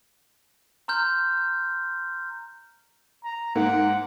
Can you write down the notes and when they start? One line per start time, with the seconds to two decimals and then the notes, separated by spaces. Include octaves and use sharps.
0.88 A#5 C6 F6 G6
3.24 A#5
3.55 G#2 A#3 F#5